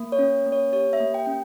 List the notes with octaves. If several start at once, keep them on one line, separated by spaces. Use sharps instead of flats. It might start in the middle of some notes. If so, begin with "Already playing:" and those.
Already playing: A#3
C#5
C#4
A#3
C#5
G4 C#5
E5
A#3
G5
C#4 G5